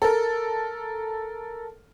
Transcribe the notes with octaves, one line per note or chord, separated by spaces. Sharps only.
A4 A#4